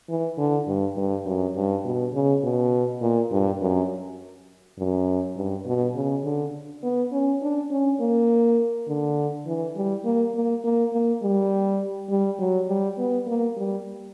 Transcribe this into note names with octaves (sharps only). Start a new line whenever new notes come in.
E3
D3
G2
G2
F#2
G2
B2
C#3
B2
A#2
G2
F#2
F#2
G2
B2
C#3
D3
B3
C#4
D4
C#4
A#3
D3
E3
G3
A#3
A#3
A#3
A#3
G3
G3
F#3
G3
B3
A#3
G3